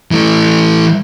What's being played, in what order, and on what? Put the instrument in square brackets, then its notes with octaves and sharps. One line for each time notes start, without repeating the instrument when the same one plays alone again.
[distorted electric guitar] E3 A3